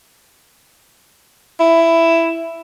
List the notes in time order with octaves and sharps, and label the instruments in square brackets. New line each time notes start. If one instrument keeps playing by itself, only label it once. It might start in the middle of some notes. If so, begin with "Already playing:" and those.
[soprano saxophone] E4